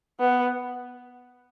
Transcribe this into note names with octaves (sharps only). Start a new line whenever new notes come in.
B3